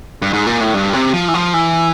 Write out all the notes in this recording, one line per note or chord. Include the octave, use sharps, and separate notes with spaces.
G2
G#2
A#2
A2
G2
C3
F3
E3
F3
E3